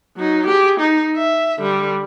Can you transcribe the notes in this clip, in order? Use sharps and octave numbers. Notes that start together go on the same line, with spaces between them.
F#3 D#4
G4 G#4
D#4
E5
D3 G3